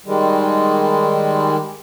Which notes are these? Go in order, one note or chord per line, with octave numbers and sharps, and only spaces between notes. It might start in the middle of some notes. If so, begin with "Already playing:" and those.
D#3 G3 G#3